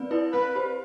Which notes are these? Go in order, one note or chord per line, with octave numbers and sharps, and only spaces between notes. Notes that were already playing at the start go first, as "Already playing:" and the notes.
Already playing: C4 B4 D5
E4 B4 D5
C4 B4
G4 C5